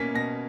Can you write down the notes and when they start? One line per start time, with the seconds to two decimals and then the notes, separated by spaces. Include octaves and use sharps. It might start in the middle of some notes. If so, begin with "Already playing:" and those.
Already playing: B2 A#3 C#4 B6
0.15 B2 A#6